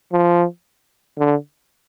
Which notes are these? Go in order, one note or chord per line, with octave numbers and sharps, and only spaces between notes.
F3
D3